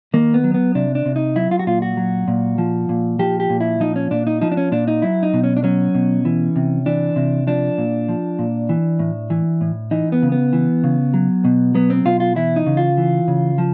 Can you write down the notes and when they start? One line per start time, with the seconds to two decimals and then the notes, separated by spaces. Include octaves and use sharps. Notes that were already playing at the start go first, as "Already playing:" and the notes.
0.14 D#3 A#3
0.34 B3
0.44 F#3
0.54 B3
0.75 C3 D4
0.95 D4
1.06 C3
1.16 D#4
1.36 F#3 E4
1.51 F4
1.59 F#4
1.67 A#2 F4
1.82 F#4
1.97 F#3
2.28 A#2
2.58 F3
2.89 A#2
3.19 F3 G4
3.40 G4
3.50 A#2
3.60 E4
3.80 F3 D#4
3.96 C#4
4.11 A#2 D4
4.27 D#4
4.41 F3 D#4
4.52 D4
4.57 C#4
4.72 A#2 D4
4.88 D#4
5.02 F#3 E4
5.23 D#4
5.33 B2
5.44 C#4
5.57 D4
5.64 F#3 C#4
5.95 B2
6.25 E3
6.56 C3
6.86 E3 D4
7.16 C3
7.47 F3 D4
7.78 A#2
8.08 F3
8.39 A#2
8.69 E3
8.99 A2
9.30 E3
9.61 A2
9.91 E3 D#4
10.12 B3
10.23 C#3
10.32 B3
10.53 E3
10.84 C#3
11.14 F#3
11.45 B2
11.74 F#3 B3
11.90 C4
12.05 B2 F4
12.20 F4
12.36 E3 E4
12.56 D#4
12.66 C#3
12.77 F4
12.98 E3
13.28 C#3
13.58 F3